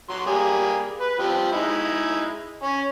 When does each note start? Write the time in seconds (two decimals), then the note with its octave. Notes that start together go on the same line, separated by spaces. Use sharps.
0.10 F#3 C6
0.27 G3 A#3 G#4
1.00 B4
1.19 F3 G3 C4
1.52 G#3 D#4 E4
2.63 C#4